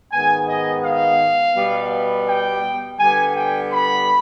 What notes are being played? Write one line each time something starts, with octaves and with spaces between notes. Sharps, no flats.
G#2 D#3 B3 G#5
D#5
F5
B2 G3 B3
G5
D3 G3 B3 G#5
G5
B5